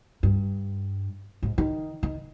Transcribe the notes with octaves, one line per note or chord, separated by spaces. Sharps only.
G2
G#2
D#3
D#3